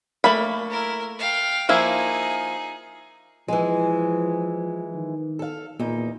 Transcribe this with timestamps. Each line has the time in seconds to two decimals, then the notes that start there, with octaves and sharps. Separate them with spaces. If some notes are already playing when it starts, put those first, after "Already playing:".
0.24 A3 A#3 B5
0.70 E4 A#4
1.19 F5 G5
1.69 F3 A#3 D#4 E4 G#4
3.48 E3 F3 G#3
4.94 D#3
5.39 A4 F5
5.79 E2 A#2 D#4